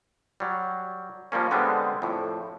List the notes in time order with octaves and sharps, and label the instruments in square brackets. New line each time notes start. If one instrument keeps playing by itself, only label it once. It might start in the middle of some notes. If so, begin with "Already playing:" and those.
[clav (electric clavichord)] F#3 G3
F3 G3 A#3 C#4
D3 G3 G#3 B3 C4
F2 A2